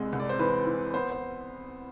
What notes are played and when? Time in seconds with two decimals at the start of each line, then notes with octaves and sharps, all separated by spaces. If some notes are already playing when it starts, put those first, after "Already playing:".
Already playing: C2 C3 G#3
0.13 C2
0.20 D5
0.29 C5
0.39 E3 B4
0.66 E3
0.94 B3 C5
1.10 C5